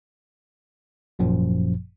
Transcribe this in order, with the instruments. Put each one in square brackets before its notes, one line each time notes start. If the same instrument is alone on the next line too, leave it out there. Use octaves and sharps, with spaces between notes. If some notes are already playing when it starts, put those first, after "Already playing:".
[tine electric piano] G#1 F#2 A#2 F3